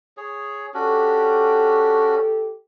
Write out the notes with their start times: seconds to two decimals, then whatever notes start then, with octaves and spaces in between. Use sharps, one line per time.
0.17 G#4 C#5
0.74 C#4 D4 F#4 G4 A4